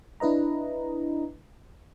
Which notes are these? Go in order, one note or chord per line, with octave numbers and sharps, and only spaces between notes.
D4 E4 B4 D#5 A#5